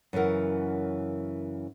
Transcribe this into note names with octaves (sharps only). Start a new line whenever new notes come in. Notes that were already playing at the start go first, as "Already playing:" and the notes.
F#2 C#3 E3 A#4 F#5